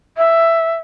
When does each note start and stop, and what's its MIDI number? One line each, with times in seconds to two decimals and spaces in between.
0.17 0.76 76